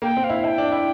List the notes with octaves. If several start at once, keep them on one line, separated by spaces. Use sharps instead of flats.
A#3 G5
C4
F5
E4
E4 A5
G5
D4
E4